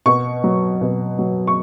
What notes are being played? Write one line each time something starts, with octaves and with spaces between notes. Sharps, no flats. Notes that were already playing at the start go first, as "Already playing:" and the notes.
B2 C#6
F#3
B2
F#3
C#6